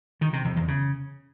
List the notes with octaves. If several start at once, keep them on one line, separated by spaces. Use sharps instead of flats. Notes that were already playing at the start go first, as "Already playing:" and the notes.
D#3
C3
F2
E2
C#3